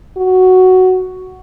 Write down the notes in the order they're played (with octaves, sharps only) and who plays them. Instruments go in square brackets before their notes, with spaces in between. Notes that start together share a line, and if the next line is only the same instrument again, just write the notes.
[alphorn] F#4